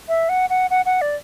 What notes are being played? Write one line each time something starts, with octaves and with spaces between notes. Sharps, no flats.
E5
F#5
F#5
F#5
F#5
D5